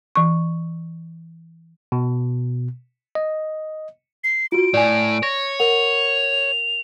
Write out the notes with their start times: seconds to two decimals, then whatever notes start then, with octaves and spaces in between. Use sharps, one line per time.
0.16 E3 C#6
1.92 B2
3.15 D#5
4.24 C7
4.52 F4 F#4 D7
4.74 A2 D5 G#5
5.23 C#5 A#6
5.60 A#4 F#5 F7